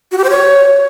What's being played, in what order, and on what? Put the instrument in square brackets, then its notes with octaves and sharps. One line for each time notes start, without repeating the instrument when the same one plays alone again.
[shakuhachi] F#4
G4
C5
C#5